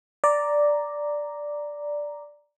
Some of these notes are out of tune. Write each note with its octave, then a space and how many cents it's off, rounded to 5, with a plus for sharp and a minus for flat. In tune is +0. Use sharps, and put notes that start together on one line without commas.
D5 +0 A#5 +0